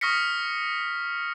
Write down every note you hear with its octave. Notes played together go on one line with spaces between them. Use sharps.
C#6 D#6 F6 A#6 B6 C#7